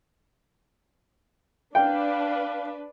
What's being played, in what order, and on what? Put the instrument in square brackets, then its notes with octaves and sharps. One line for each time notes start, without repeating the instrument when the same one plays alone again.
[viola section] D4 B4 [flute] F5 [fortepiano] G5